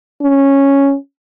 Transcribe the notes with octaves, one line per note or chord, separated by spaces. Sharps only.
C#4